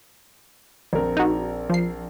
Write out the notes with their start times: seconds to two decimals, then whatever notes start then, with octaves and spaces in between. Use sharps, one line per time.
0.93 A#1 C4 A#4
1.17 D#4 F#4
1.70 F3 C7